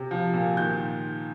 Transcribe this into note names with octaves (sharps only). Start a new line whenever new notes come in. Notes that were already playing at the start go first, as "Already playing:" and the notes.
Already playing: C3
F3
A#2
D#3 G6